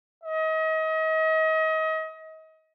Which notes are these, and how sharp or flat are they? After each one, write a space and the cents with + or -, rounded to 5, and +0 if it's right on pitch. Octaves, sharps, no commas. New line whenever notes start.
D#5 +35